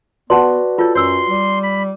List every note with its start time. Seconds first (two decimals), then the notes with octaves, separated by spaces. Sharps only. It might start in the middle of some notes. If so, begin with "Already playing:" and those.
0.30 B3 F#4 B4 D5 F#5 A5 C6
0.78 F4 A4 C#5
0.96 F#2 C#5 C6 E6
1.29 G3
1.63 B5